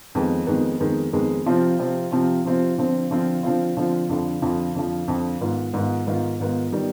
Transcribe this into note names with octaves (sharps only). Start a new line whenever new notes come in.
F2 D#3 G#3 B3
F2 D#3 G#3 B3
F2 D#3 G#3 B3
F2 D#3 G#3 B3
C3 F3 C4 F4
C3 F3 C4 F4
C3 F3 C4 F4
C3 F3 C4 F4
D3 F3 C4 F4
D3 F3 C4 F4
D3 F3 C4 F4
D3 F3 C4 F4
F2 D3 F3
F2 D3 F3
F2 D3 F3
F2 D3 F3
G#2 D#3 B3 F4
G#2 D#3 B3 F4
G#2 D#3 B3 F4
G#2 D#3 B3 F4
D#3 G3 B3